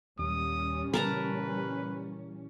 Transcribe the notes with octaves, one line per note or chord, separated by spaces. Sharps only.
D#2 A#2 G3 C#4 D#6
C#3 E3 A#4 B4 A5 A#5